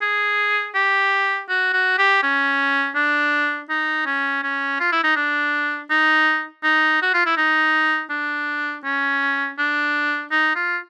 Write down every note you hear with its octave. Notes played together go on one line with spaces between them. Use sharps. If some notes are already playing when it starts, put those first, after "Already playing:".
G#4
G4
F#4
F#4
G4
C#4
D4
D#4
C#4
C#4
F4
E4
D#4
D4
D#4
D#4
F#4
F4
E4
D#4
D4
C#4
D4
D#4
F4